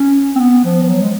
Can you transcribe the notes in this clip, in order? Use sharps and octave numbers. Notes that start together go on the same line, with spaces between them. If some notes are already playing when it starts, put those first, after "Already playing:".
Already playing: C#4
C4
B3
F3
F3
F#3
G#3